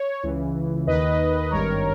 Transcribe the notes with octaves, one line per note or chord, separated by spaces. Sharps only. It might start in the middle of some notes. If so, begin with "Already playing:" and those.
Already playing: C#5
C#2 C#3 E3
D#2 D#3 B4 D#5
G#1 G2 D#3 A#4 C#5